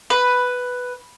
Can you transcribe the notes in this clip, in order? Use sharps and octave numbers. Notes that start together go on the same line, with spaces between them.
B4